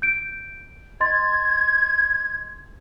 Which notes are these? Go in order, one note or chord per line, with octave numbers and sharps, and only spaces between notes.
G6 D7
D#5 C6 G#6 A6